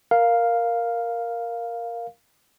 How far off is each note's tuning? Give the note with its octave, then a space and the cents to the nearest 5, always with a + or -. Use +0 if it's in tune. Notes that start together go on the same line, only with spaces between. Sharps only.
A#4 +0 F5 +0